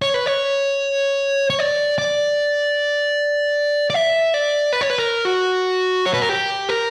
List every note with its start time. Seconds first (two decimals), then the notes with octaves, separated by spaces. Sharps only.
0.02 C#5
0.14 B4
0.26 C#5
1.50 C#5
1.59 D5
1.98 D5
3.90 D5
3.94 E5
4.34 D5
4.73 B4
4.81 C#5
4.90 B4
4.99 A#4
5.25 F#4
6.06 C#5
6.14 B4
6.22 A#4
6.29 G4
6.69 A#4